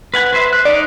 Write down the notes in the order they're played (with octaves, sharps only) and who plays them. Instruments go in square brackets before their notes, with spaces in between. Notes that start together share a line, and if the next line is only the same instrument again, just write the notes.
[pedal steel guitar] B4 F#5 G#5
B4 C5 E5
F#6
[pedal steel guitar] D#4 [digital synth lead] D5